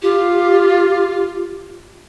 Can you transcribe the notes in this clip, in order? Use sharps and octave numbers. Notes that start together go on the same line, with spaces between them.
F4 G4